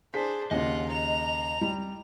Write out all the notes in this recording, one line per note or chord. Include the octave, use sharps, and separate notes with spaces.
D4 G#4 C5 B6
D#2 C#3 F4 D#5 F#5
A#5 F7
G3